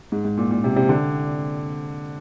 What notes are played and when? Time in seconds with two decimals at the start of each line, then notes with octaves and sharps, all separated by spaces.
0.12 G#2
0.25 G#2
0.38 A#2
0.51 A#2
0.64 C3
0.76 C3
0.89 D3